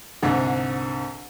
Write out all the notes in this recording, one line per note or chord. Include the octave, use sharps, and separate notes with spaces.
C2 G#2 D3